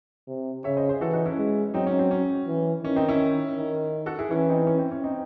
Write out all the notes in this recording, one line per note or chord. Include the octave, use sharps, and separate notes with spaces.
C3
C#3 C#5 E5
C5 D#5
G#4 C5
E3 F#4 A4
D#4 F#4
C#4 E4
G#3
F#3 C4 D#4
C#4
C4
C#4
E3
D#3 C#4
C4 D#4
C#4 E4
D#3
F#4 A4
E4 G#4
E3 C#4 E4
C4 D#4
C#4
C4
C#4
C4 D#4